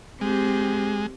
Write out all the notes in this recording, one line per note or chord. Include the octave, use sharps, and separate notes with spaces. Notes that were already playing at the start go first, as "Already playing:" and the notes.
G#3 C4 G4